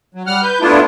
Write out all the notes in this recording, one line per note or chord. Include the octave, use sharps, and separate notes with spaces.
F#3
G3 F#5 F6
B4 G6
A3 B3 D4 E4 F4